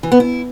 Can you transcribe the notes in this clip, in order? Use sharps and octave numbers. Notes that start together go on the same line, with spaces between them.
E3
B3
E4